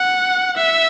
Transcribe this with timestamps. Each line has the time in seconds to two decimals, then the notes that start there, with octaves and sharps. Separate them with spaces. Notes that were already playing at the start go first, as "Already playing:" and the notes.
Already playing: F#5
0.57 E5